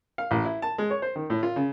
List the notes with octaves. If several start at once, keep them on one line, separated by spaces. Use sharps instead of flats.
F5
A1
E4
A5
G#3
C#5
C5
D#3
A2
F4
C#3